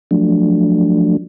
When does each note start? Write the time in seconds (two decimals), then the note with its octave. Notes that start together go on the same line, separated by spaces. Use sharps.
0.11 F3 F#3 A3 D4